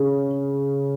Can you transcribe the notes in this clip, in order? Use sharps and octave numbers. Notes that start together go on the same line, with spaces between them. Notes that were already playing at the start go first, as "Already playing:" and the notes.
Already playing: C#3